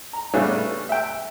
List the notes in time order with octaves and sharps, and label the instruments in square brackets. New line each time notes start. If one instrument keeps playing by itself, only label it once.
[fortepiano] A#5
C#3 G3 A3 B3 C#4 D4
E5 G5